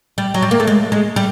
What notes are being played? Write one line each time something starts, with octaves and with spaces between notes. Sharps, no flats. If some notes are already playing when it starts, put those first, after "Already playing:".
G3
F#3
G3
A#3
A3
G#3
G#3
G3